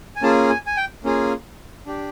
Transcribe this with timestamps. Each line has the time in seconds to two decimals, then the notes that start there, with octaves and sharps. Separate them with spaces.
0.16 G#5
0.22 A#3 C#4 F4 G#4 A5
0.50 G#5
0.66 G#5
0.77 G5
1.04 A#3 C#4 F4 G#4
1.86 D4 G4